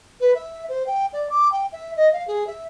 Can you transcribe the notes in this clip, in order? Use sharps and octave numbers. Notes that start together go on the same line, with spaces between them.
B4
E5
C5
G5
D5
D6
G5
E5
D#5
F5
G#4
E5